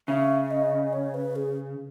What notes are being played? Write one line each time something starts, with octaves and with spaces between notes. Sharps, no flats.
C#3 E5
D#5
C#5
B4
G#4